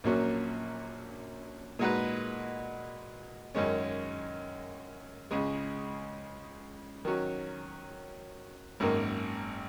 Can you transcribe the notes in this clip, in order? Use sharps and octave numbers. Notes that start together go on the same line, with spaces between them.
A#1 A#2 F#3 A#3 C#4
A#2 G#3 D#4 F#4 B4
F#2 D#3 G#3 C#4
C#2 C#3 G#3
D#3 F#3 C#4
G#1 F#2 D#3 A#3